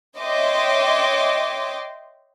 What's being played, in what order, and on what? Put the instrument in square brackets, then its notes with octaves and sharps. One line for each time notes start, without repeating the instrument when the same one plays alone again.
[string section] C#5 D#5 E5 G5 C6 D6